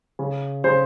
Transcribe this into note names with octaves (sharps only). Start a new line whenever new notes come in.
C#3
C#3 C5